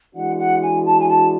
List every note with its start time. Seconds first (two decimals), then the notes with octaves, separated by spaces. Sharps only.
0.15 E3 G#3 D4 F#4 F#5
0.39 F#5
0.63 G#5
0.85 A5
1.00 G#5
1.09 A5